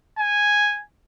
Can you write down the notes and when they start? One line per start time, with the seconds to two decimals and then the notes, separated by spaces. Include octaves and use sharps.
0.19 G#5